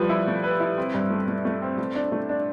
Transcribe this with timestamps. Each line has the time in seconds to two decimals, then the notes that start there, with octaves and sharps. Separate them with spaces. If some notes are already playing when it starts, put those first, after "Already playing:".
Already playing: F3 G3 B4
0.09 E4
0.28 A3
0.44 B4
0.60 E4
0.78 C4
0.94 G2
1.11 A3
1.28 A3
1.45 A3
1.62 C4
1.78 A3
1.95 D4
2.12 A3
2.29 D4